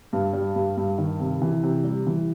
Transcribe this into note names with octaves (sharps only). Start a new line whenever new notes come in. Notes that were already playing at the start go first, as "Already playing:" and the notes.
G2
G3
G2
G2
D#3
C3
E3
C3
G3
E3